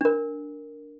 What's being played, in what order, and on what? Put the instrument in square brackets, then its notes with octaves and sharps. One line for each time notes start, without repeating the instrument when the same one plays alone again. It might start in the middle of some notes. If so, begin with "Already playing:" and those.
[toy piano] D4 A#4